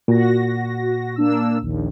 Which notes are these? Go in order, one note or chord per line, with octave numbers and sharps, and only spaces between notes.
A#2 F#4 A#6
A#3 D4 E6
A#1 D#2